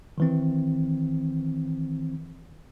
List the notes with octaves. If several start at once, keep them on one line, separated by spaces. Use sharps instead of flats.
D#3 E3 C4